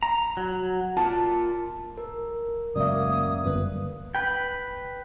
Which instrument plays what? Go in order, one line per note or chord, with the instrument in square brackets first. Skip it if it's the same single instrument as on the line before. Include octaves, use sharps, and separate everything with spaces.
[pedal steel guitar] A#5
F#3
[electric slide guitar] F4 A#4 [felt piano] A5
[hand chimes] A#4
[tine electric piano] F#2 A#3 [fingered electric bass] A2 C#3 G#3 [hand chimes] D5 E5 [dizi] D#6
[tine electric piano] G1 [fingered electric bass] F#2 E3 G3 [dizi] B4
[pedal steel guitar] B4 G5